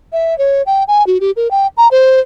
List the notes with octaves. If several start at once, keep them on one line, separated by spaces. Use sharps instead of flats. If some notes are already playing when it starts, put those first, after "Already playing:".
E5
C#5
G5
G#5
F#4
G4
A#4
G5
A#5
C5